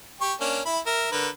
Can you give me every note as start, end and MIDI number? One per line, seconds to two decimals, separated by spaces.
0.21 0.34 67
0.21 0.34 85
0.40 0.60 58
0.40 0.60 61
0.40 0.60 62
0.65 0.79 64
0.65 0.79 83
0.86 1.08 70
0.86 1.08 76
1.12 1.28 50
1.12 1.28 70
1.12 1.28 71